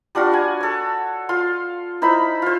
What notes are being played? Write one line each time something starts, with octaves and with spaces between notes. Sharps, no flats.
G3 D4 F4 F#4
F#5 G#5
A4 C#5
F4 C6
D#4 E4 C5 B5
F4 C5